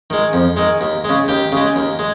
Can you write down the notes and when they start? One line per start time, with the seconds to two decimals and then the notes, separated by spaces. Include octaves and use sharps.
0.10 D#3 G#3
0.33 F2
0.57 D#3 G#3
0.81 D#2
1.04 C#3 G#3
1.28 D#2 G4
1.52 C#3 G#3
1.76 D#2
1.99 G#3